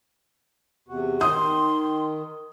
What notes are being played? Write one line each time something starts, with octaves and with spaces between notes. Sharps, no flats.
E2 C3 F#4
D#3 C6 D#6